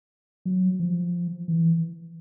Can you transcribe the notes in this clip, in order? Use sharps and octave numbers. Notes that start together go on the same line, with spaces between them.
F#3
F3
E3